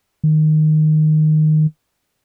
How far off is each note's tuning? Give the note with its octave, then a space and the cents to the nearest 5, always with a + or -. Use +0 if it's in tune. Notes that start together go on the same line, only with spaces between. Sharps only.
D#3 -10